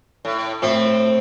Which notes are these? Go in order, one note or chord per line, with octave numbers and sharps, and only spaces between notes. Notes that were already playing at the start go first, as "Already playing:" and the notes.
A2
A2 C4